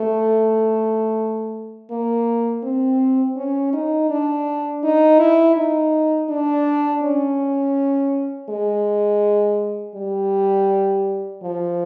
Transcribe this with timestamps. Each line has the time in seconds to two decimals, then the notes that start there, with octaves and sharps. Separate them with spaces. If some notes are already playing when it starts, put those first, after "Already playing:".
Already playing: A3
1.91 A#3
2.63 C4
3.36 C#4
3.73 D#4
4.10 D4
4.84 D#4
5.19 E4
5.56 D#4
6.29 D4
7.03 C#4
8.49 G#3
9.95 G3
11.43 F3